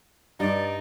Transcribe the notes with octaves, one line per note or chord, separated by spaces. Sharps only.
G2 D#4 D5